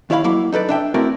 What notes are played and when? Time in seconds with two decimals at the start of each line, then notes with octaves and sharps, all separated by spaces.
0.10 D#2 E4 C#5 F5 B5
0.24 F#3 A#3 E4
0.52 D#4 A4 B4 D5
0.69 D4 E5 G5
0.94 A3 C4 E4 F#4 A#4 D5